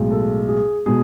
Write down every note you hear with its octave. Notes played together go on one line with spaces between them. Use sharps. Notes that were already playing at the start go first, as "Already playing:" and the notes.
Already playing: B1 A2 G#3
A4
G#4
B2 G#3 G#4